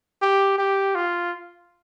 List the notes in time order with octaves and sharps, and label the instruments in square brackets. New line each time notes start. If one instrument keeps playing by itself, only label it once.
[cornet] G4
G4
F4